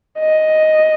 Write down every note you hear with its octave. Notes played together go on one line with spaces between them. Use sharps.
D#5